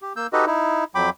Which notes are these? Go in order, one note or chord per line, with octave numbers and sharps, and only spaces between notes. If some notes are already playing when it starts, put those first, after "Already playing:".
G4
A#3 E6 G6
D#4 F#4 G4 A4 B4 D#5
D#4 E4
F2 F#3 G5 B5 D6